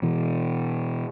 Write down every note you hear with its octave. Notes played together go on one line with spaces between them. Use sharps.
B2 E3